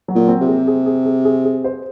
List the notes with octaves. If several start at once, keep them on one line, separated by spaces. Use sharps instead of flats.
F#3
A#2
C4
C3
G#4
G#4
G#4
G#4
G#4
G#4
C5